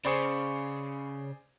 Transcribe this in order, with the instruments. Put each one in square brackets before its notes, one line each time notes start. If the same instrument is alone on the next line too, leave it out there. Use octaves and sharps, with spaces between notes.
[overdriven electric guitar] C#3 [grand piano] G#4 C5 D5 [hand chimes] B5 C#6 C#7